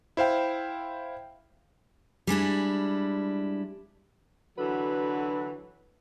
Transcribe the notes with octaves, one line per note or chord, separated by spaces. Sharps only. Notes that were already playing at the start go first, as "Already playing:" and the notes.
E4 C5 F5 G5
G3 G#3 D4 E4
D3 E3 F#3 F#4 A4 B4